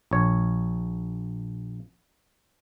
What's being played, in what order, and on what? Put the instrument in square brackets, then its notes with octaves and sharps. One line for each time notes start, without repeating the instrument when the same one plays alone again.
[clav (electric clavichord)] A#1 C#5